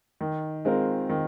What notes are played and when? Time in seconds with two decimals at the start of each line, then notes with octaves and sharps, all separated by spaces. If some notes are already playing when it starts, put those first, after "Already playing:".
0.21 D#3
0.65 G#3 C4 F4 A#4
1.10 D#3